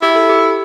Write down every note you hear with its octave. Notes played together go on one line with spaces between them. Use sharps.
E4 G4
A4
G4